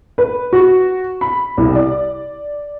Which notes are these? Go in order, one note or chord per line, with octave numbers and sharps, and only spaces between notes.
B4
F#4
B5
C2
D5